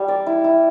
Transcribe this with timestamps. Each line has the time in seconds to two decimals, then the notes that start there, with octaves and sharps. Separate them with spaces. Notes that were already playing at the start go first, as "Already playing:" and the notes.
Already playing: G3
0.08 D5
0.26 E4
0.44 E4